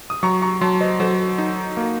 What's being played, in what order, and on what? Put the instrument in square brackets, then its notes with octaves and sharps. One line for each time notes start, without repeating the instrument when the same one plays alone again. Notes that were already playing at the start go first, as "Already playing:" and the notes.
[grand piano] D#6
[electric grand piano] F#3 [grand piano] A#5 C#6
[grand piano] A#5 C#6
[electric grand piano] F#3 [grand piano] A5 C6
[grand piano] C5 D#5
[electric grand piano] F#3 [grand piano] A4 C5
[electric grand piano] D#4
A#3